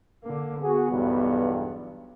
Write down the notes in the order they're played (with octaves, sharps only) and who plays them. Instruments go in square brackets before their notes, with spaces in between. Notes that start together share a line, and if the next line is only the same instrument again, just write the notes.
[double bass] D3 A#3
[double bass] B3 [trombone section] F#4 G#4
[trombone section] B1 E2 G2